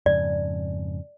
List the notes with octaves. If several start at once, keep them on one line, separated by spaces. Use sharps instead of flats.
F2 G#2 C#3 D5